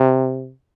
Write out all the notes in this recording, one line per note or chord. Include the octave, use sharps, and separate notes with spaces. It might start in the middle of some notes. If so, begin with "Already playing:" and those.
Already playing: C3